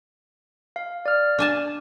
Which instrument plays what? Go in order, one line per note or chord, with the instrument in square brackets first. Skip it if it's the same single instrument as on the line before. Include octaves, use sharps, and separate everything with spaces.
[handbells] F5
D5 F6
[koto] D4 G#5 A5